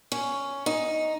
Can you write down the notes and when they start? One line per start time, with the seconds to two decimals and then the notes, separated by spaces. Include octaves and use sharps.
0.12 C#4
0.66 D#4